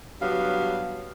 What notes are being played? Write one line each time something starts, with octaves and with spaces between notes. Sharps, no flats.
F#3 G3 B3 D4 C#5 F5